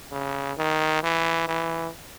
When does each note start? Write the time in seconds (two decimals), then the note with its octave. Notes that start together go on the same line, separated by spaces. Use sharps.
0.11 C#3
0.58 D#3
1.03 E3
1.48 E3